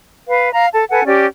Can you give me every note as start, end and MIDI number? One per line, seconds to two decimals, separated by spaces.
0.28 0.50 71
0.28 0.50 77
0.53 0.67 77
0.53 0.67 82
0.73 0.84 69
0.73 0.84 81
0.90 1.03 69
0.90 1.03 71
0.90 1.03 78
0.90 1.03 80
1.06 1.26 61
1.06 1.26 67
1.06 1.26 74